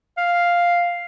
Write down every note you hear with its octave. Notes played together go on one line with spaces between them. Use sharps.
F5